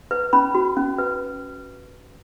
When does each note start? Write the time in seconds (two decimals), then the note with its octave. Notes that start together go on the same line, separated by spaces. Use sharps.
0.11 B4
0.33 C#4 B5
0.55 F#4
0.77 C#4
0.98 B4